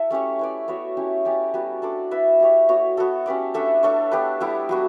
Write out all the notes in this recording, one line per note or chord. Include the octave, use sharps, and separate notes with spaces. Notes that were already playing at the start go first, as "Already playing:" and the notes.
Already playing: E4 A4 E5
A3 C#4 G4 C#5
E4 B4 D5
B3 F#4 C#5 E5
C#4 E4 G4
C#4 G4 D5
G3 B3 F#4 B4
D4 A4 D5
E4 B4 E5
E4 G4 C#5
B3 F#4 C#5
B3 F#4 A4
C#4 G4 B4 D5
A3 D4 A4 E5
A3 D4 A4 C#5
B3 D4 G4 B4
G3 B3 E4 G4
F#3 B3 F#4